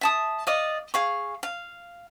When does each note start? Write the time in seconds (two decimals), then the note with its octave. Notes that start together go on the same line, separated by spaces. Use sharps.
0.01 E5 A5 D#6
0.47 D5 D#5 F5
0.94 G#4 F5 C#6
1.43 F5